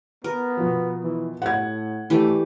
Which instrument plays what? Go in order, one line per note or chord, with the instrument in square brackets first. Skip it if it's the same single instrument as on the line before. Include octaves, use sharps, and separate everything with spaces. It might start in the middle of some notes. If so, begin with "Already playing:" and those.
[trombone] B3 [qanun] A#4
[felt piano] B2 F3
[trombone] E3
[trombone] A2 [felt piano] F#5 G#6
[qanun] E3 G4 D5 [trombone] A3